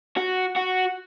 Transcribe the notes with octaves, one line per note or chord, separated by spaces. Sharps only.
F#4
F#4